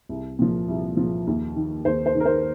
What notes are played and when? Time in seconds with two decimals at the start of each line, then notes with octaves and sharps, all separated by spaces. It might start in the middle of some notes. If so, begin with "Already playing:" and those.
0.09 C2
0.39 A#2 F3
0.68 C2
0.97 A#2 F3
1.27 D#2
1.56 D#3
1.85 D#2 C5
2.06 C5
2.15 D#3
2.20 A#4
2.26 C5